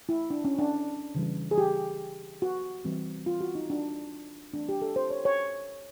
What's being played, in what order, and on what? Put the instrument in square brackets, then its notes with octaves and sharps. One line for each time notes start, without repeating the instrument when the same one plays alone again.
[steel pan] E4
D4
C#4
D4
C#3 E3 G3
G#4
G4
F#4
E3 G3 C4
F4
F#4
D#4
D4
E3 A3 C4 D4
G4
A4
C5
C#5
C#5